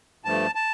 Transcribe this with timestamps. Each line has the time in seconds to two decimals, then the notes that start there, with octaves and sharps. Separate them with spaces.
0.24 G2 F3 A3 A5
0.55 A5